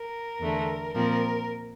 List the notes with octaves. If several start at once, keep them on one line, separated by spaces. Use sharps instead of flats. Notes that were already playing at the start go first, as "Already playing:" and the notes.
Already playing: A#4
E2 D3 A3
A#2 F3 C4 A#4